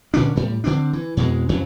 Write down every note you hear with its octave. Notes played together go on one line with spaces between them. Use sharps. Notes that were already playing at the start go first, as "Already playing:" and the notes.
A#2 D3 C#4 D4
A2 G3
D3 C4 D4
E3
F2 B2 E3 G#3
F2 C#3 E3 F#3